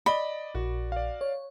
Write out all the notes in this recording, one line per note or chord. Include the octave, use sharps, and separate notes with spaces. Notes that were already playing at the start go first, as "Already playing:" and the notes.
D5 D#5 B5 G7
A#1 F#4
D5 F5
C#5